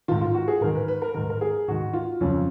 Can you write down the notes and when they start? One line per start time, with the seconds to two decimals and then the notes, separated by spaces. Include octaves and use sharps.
0.08 G#2 D#3 F4
0.21 F4
0.34 F#4
0.48 G#4
0.61 G#2 D#3 A#4
0.75 B4
0.88 B4
1.02 A#4
1.14 G#2 D#3 A#4
1.30 A#4
1.41 G#4
1.68 G#2 D#3 F#4
1.93 F4
2.21 F2 C#3 C#4